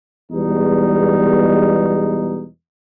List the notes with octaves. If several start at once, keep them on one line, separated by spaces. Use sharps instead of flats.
E2 B2 G3 G#3 D#4